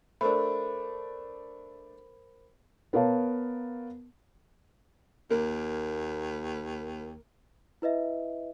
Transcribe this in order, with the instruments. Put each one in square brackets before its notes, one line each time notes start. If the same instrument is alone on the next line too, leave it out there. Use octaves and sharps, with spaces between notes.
[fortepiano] A3 D4 [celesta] A#4 C5 B5
[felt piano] B3 A#4 C#5 F5 A5
[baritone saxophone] D#2 [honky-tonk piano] A#3
[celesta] E4 B4 D#5 E5